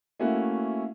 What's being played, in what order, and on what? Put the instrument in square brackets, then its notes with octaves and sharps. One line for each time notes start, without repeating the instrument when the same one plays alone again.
[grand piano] A3 A#3 C#4 E4 F#4